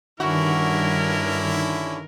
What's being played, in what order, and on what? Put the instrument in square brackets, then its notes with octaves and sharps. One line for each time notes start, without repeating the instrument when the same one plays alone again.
[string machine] G2 D#3 [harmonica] D3 C#4 E4 [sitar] F#4 [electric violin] A#4